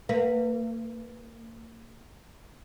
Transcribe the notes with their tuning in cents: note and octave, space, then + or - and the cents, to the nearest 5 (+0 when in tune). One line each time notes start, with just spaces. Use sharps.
A#3 -40 B4 +0